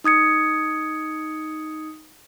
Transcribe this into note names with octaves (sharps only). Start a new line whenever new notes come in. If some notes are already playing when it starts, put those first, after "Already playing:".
D#4 D#6 G#6 C#7